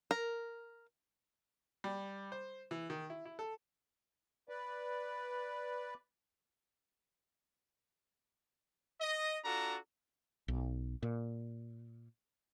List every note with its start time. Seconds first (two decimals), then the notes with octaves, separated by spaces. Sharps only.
0.11 A#4
1.84 G3
2.32 C5
2.71 E3
2.90 D#3
3.10 E4
3.25 E4
3.39 A4
4.49 B4 D5
9.01 D#5
9.44 D4 F4 F#4 A4 A#5
10.48 B1
11.03 A#2